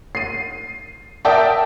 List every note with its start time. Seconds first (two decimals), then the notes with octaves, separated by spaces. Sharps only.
0.15 C7 D#7
1.25 A#4 D5 E5 G5 A5 D#6